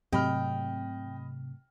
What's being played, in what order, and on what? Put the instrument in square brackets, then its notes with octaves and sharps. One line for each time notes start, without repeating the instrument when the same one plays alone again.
[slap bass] G#2 F#3 A3 [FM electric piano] C3 [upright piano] D#5 B5 F6 [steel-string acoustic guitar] G5